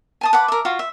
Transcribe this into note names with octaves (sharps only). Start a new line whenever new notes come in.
G#5 A5 D#6
B4 F#5 D6
A#4 E5
F4 F#4 F5
E5